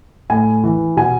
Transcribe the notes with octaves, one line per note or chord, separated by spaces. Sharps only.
A2 G#5
E3
B2 G#5